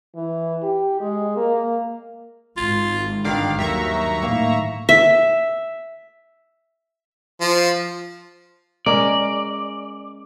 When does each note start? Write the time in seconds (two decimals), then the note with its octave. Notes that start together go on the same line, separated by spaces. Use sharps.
0.15 E3
0.63 G4
1.01 G#3
1.37 A#3
2.57 G#1 F4
3.25 G2 D3 D#3 F5 D6
3.59 D#2 F#3 A#3 E5 A#5 C#6
4.22 A2 D#3 A#3 F5
4.89 E5
7.41 F3
8.86 G#3 C#4 A#4 D5